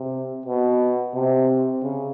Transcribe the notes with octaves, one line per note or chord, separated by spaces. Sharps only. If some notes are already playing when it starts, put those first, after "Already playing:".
Already playing: C3
B2
C3
C#3